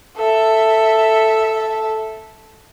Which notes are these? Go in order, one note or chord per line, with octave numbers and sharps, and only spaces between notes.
A4 E5